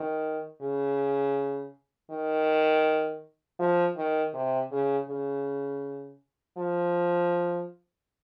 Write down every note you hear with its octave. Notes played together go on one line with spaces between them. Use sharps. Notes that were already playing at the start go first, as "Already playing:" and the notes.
Already playing: D#3
C#3
D#3
F3
D#3
C3
C#3
C#3
F3